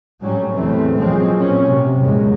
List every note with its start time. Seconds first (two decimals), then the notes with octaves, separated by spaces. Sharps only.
0.21 A2 F#3 G3 C#4
0.52 E2 C3 E3 A3 C4
0.96 A#2 F3 F#3 G#3 C4 C#4
1.36 A#2 C#4
1.68 C3 F#3
2.00 E2 G2 A#2 F#3 G#3